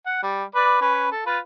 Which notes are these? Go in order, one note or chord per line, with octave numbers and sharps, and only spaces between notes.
F#5
G3
B4 D5
C#4 B4
A4
F4 B4